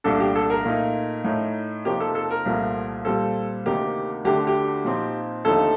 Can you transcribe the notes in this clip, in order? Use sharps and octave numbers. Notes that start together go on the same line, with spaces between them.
C2 A#2 A3 D4 A4
G4
A4
A#4
A#2 A3 D#4
A2 A3 D#4
C3 F3 A#3 D#4 G4
A4
A4
A#4
C2 A#2 F3 A3
A#2 G3 C4 A4
D2 C3 D#3 A#3 D#4 G4
D2 D3 A3 D4 G4
G4
A#2 F3 C4 D#4
D#2 D3 F3 A3 D#4 A4